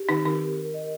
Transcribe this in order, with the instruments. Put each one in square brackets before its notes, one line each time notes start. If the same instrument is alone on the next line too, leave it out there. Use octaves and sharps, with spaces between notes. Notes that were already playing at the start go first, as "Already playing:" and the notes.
Already playing: [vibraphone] G4
[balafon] D#3 D#4 [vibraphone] C4
[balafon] D#3 D#4 [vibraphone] A#4
[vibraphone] A#4
A#4
D#5